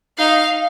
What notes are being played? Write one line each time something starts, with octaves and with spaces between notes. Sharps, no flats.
D#4 F5